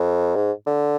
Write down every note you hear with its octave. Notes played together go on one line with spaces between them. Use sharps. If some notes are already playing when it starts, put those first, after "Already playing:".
Already playing: F2
G#2
D3